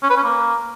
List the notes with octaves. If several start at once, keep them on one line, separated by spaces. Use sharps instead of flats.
C#4
B4
C#4
A#3